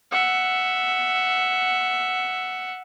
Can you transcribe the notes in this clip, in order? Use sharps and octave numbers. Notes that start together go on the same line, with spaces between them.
E5 F#5